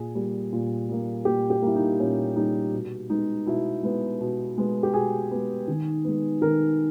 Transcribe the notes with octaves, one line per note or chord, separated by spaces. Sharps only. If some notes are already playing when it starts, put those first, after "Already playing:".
Already playing: A#2 G#4
G3 A#3
A#2
G3 A#3
A#2 G4
G4
G3 A#3 E4
D#4
A#2 C#4
G3 A#3 D#4
B2
G#3 B3 D#4
B2 E4
G#3 B3
B2
G#3 B3
G4
B2 G#4
G#3 B3
D#3
G#3 B3
D#3 A#4